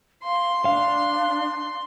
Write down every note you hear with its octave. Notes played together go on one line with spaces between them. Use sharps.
F5 C6
D4 F5